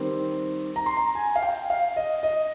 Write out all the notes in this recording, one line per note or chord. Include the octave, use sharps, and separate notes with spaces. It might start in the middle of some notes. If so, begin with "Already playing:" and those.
Already playing: D#3 G3 C4
A#5
C6
A#5
G#5
F5
G5
F5
D#5
D#5